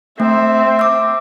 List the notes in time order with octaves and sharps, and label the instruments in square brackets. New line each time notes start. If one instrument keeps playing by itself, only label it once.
[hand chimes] A3 [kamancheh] C4 [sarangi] E5
[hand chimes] D6 E6